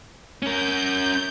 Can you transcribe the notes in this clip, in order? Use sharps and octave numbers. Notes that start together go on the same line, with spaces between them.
C#4 A#4 G6